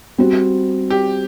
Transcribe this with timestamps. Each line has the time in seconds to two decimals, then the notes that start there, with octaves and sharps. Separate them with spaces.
0.18 G3 C4 F#4 C5
0.90 G4